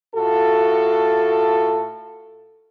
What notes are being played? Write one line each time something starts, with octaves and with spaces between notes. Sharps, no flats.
A2 F4 F#4 A4